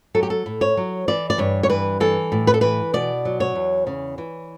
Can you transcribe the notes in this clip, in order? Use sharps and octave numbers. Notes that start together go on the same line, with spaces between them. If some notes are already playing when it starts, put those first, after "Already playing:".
F#3 A4
G4
A4
A2
C#5
F#3
E3 D5
D5
G2 C#5
C#5
E3 B4
E3 A4
A2
B4
A4
E3 B4
B2 D5
F#3
C#5
E2
C#3
E3